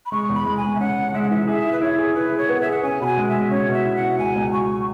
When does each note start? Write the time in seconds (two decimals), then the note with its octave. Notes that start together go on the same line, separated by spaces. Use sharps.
0.06 B5
0.12 G#3 C#6
0.29 E2 B5
0.46 G#3
0.57 G#5
0.62 G#3
0.75 E5
0.80 C#4 F#5
0.97 C#4
1.14 G#3 E5
1.22 F#5
1.31 E3 E5
1.48 G#4 E5
1.64 E4
1.72 B4
1.81 E4 C#5
1.98 G#4
2.15 E4 B4
2.32 G#4
2.38 C#5
2.49 B3
2.61 G#4 E5
2.72 F#5
2.83 C#4 G#5
3.01 B2 B5
3.06 G#5
3.18 G#3
3.29 E5
3.34 G#3
3.51 C#4 C#5
3.68 B2
3.73 E5
3.85 E4
3.96 F#5
4.02 B2
4.19 C#2 G#5
4.36 C#2
4.52 F#3 C#6